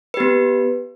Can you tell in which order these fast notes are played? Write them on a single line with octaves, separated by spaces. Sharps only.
B4 G4 B3